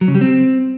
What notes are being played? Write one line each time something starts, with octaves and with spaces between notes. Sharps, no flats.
F#3
C#3
G3
C4